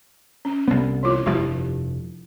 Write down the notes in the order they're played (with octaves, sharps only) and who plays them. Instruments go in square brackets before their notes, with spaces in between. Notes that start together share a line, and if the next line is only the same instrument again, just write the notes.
[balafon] C#4
[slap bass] C2 B3
[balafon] E3 E4 F4
[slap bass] F1 G2 F3 [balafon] E4